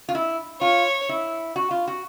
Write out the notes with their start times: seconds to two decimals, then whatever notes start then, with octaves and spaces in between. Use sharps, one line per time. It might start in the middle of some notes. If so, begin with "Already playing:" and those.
0.09 F4
0.15 E4
0.61 F4 C#5
1.09 E4
1.56 F#4
1.71 F4
1.88 F#4